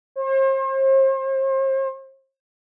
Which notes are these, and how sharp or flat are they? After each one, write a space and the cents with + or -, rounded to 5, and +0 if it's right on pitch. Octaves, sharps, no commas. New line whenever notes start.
C5 +40